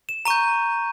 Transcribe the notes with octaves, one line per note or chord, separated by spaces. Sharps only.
E7
A#5 C#6 G6 D#7